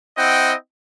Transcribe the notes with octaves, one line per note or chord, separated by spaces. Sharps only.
C4 E4 D#5 F#5 G5